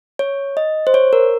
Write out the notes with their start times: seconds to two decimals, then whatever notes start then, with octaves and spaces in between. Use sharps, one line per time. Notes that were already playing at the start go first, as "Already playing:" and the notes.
0.19 C#5
0.57 D#5
0.87 C5
0.94 C#5
1.13 A#4